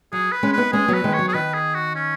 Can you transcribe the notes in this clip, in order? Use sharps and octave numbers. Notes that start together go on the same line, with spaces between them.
F#3 G#4
B4
G#3 C#4
B3 D#4 B4
G#3 C#4 G#4
F#3 B3
B4
D#3 G#3
C#5
F#3
G#4
D#3 B4
G#4
F#4
C#4